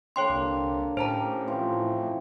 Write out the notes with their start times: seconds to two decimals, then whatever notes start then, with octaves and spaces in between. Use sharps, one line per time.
0.16 D3 A#3 C#5 G5 C6
0.30 C2 D5
0.97 A2 C#4 G4 C5 C#5 A5 A#5
1.47 E3 F3 C4